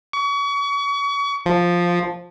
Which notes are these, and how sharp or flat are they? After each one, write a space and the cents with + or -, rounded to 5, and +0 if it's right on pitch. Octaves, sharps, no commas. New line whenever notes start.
C#6 +35
F3 +5